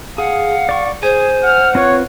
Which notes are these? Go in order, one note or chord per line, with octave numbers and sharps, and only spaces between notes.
G#4 F5 F#5
D5 C#6
G#4 C5 G#5
F#5 F6
C4 F4 B4 C#5